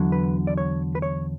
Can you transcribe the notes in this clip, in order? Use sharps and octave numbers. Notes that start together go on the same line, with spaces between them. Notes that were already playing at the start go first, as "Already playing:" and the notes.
Already playing: E2 D3 F#3
B4
D5
C#5
B4
C#5